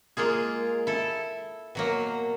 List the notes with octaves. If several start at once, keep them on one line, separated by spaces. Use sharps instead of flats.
G#3 A#3 F4 G#4
E4 A4
B2 F#3 A#3